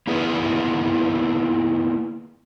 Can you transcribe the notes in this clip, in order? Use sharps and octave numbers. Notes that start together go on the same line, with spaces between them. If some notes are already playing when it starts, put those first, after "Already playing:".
A#3 B3 E4 G#4 B4